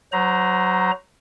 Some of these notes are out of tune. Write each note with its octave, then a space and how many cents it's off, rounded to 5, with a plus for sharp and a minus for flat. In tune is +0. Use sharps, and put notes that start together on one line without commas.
F#3 +0 C5 -25 A#5 +15